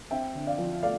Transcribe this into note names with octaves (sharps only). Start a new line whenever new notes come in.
C4 E5 G5
D3
D5 F5
F3
A3 D5 F5